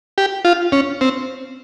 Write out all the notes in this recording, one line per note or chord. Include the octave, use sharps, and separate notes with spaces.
G4
F4
C#4
C4